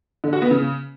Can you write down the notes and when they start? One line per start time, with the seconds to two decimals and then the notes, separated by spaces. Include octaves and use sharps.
0.24 D3
0.33 F#4
0.42 B3
0.51 C#3